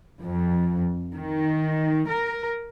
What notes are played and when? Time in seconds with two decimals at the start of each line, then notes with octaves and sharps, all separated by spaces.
0.24 F2
1.17 D#3
2.11 A#4